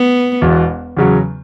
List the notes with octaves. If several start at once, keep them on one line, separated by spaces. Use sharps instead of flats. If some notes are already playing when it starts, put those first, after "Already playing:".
Already playing: B3
E1 E2 B2
E2 C#3 F#3